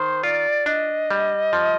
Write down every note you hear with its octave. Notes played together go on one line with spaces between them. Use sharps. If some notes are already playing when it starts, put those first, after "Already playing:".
Already playing: D#3 C5
F4 D5
D4 D#5
G3
F3